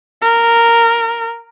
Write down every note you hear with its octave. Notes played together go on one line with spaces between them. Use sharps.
A#4